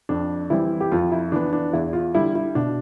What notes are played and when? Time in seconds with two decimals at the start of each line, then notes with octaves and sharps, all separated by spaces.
0.09 F2 D4
0.50 E3 G3 C4 E4
0.81 G4
0.92 F2 F4
1.12 E4
1.32 E3 B3 D4
1.53 D4
1.73 E2 E4
1.93 F4
2.14 D3 G3 E4
2.35 E4
2.55 B2 D4